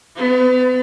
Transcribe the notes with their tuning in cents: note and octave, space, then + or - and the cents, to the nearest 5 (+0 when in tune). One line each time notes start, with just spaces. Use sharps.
B3 +40